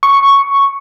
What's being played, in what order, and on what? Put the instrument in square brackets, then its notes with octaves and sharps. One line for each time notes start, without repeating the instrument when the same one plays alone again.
[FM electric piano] C#6